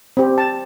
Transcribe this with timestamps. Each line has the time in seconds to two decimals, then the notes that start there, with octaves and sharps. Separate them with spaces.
0.17 C4 G4
0.38 A5